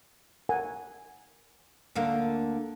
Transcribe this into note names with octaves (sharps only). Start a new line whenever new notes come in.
A#4 F#5 G#5
D2 D3 A#3